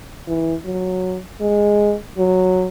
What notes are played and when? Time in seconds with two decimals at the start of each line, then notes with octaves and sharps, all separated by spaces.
0.28 E3
0.65 F#3
1.41 G#3
2.18 F#3